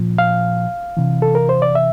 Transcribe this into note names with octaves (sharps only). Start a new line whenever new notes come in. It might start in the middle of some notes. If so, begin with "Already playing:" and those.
Already playing: A#2 F3
F5
C3 E3
A4
A#4
C5
D5
E5